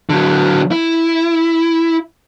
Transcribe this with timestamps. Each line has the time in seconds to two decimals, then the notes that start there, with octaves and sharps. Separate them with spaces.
0.10 D3 F#3
0.71 E4